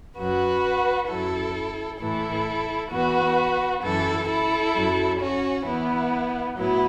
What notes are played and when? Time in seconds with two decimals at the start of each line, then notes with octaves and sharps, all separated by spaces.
0.17 F#2 F#3 F#4 B4
1.08 F#2 F#3 E4 A4
2.00 A2 E3 E4 A4
2.91 E2 E3 F#4 B4
3.83 F#2 E3 E4 A4
4.28 E4 A4
4.74 F#2 F#3
5.20 C#4 F#4
5.65 E2 E3 B3 E4
6.57 A2 F#3 B3 E4